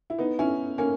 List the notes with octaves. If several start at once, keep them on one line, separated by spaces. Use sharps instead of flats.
E4
B3 D#4
C#4 E4
A#3 C#4